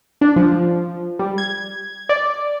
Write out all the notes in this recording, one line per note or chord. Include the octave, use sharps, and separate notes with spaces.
D4
F3
G3
G#6
D5